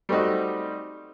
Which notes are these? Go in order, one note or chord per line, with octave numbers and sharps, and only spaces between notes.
G3 A3 C4 D#4 F#4